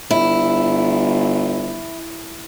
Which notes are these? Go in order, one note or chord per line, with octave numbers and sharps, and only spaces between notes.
G1 E4